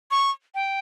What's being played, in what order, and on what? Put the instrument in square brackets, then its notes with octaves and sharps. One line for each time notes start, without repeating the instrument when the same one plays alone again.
[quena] C#6
G5